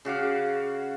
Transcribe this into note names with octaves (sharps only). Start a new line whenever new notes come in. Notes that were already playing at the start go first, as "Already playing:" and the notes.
C#3 F#4 F5 D6